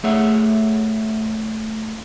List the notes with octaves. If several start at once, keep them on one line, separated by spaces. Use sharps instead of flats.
A3 G#4 C#5 E5 F#5